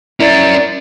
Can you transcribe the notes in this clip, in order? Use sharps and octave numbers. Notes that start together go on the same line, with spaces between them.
C#4 E4 A#4 D5